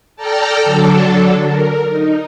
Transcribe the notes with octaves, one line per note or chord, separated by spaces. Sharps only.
A4 D5 G5 A5 A#5 F6
D3 F#3 D4 A4
A#4
D#4